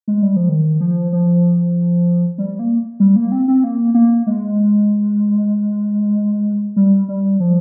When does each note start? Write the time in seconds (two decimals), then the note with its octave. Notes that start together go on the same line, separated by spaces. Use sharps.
0.08 G#3
0.22 G3
0.36 F3
0.49 D#3
0.80 F3
1.12 F3
2.38 G3
2.59 A#3
3.00 G3
3.16 A#3
3.32 C4
3.48 C4
3.64 A#3
3.94 A#3
4.27 G#3
6.76 G3
7.08 G3
7.40 F3